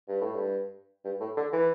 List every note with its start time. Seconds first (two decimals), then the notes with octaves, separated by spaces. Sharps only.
0.08 G2
0.22 A2
0.35 G2
1.05 G2
1.20 A2
1.37 D3
1.53 E3